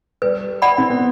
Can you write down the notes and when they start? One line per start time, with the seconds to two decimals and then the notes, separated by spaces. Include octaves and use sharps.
0.22 G3 B4
0.62 D5 F#5 B5
0.78 C4
0.90 B3